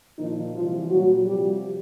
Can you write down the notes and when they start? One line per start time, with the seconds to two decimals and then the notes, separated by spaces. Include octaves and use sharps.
0.18 A#2 D#3 F3 D#4
0.54 C3 E3 F3 G3 F4
0.90 A#2 F#3 G3 F#4
1.25 C3 F3 G3 G4